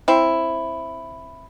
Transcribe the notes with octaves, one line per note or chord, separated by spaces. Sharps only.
C4 E4